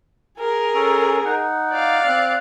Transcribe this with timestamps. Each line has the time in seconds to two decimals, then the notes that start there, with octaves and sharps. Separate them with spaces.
0.39 G#4 A#4
0.75 C#4 A4
1.25 D#4 F#5
1.70 D5 F5
2.05 C4 F#6